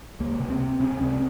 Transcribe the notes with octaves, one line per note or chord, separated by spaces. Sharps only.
C#2 A#3
C3
C4
C3
C3 C#4
C#2 C4